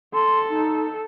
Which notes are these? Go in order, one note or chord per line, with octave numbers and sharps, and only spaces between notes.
A4 C6
D#4